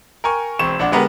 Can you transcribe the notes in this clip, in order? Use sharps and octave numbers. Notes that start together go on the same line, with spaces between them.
A#4 G5 G#5 C#6
E1 C4 C#6 E7
A#1 D4 F#5
D3 G#3 B3 G4 A#4 B4